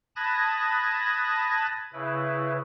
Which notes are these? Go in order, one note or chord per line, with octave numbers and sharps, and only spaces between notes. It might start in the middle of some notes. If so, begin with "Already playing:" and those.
A5 B5 D#6 F#6 G#6 A#6
C#3 E4 B4